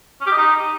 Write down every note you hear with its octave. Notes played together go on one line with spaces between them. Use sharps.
C#4
G4
D#5
D#4